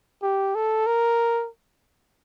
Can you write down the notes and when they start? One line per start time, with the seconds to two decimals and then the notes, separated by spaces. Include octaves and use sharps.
0.23 G4
0.55 A4
0.87 A#4